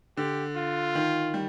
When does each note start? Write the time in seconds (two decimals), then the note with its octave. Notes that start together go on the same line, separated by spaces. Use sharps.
0.17 D3 G4
0.56 F4
0.95 D#3
1.34 G3